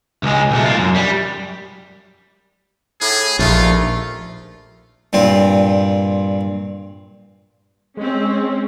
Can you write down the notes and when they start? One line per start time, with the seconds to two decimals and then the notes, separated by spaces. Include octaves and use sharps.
0.23 C#2 G#3
0.51 B1 A3
0.66 A#3 F4
0.79 F#2
0.96 G3
3.01 A2 G#4
3.39 A#1 D#2 A3 F4
5.13 G2 A#2 C4 F4
7.97 G#3 C4 C#4